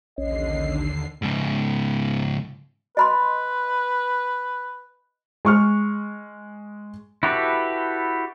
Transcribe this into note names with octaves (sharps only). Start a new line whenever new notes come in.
A#1 D#2 D3 C#4 D#5 C7
G#2 C#3
B4 D#5 B5 C6
G#3 C#6 F6
E4 F#4 G4 A4 B4